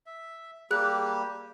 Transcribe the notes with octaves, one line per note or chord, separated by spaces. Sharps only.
E5
G3 A#3 G4 G#4 F#6